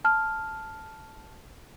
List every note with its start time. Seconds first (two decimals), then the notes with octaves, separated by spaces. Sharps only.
0.05 A5 F6